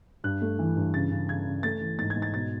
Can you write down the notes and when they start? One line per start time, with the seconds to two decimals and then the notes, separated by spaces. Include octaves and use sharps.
0.24 G2 F#6
0.41 A3
0.59 E3
0.77 G2
0.94 C#3 A6
1.11 C#3
1.29 C#3 G#6
1.46 C#3
1.63 A3 A6
1.81 E3
1.99 G#2 A6
2.10 G#6
2.16 G#2
2.22 A6
2.34 B2 A6